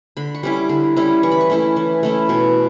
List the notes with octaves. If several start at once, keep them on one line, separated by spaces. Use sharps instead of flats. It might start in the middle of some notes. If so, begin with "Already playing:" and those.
D3 B5
C#6
G3 C#4 E4
D6
D3
G3 C#4 E4
E3 C#6
B5
C#6
A3 C#4 E4
E3
A3 C#4 E4
B2 C#6